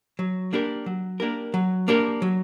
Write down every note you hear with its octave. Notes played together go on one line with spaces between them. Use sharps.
F#3
A#3 D4 G4 A#4
F#3
A#3 D4 G4 A#4
F#3
A#3 D4 G4 A#4
F#3